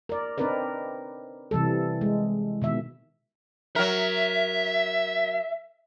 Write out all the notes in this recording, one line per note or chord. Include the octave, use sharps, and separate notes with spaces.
A#4 D5
C4 D4 D#4 A#4 B4 D5
C3 E3 G3 A4
G#3
B2 D#3 E5
F#3 A#4 E5